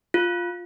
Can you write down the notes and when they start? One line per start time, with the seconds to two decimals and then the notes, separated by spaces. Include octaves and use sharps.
0.14 F4